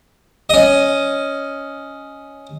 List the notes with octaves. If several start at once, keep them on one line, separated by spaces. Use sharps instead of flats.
C#4 D#5